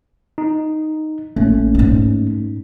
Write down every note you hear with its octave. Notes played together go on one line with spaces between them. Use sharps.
D#4
A1 A3 A#3 C#4
G#2 D#4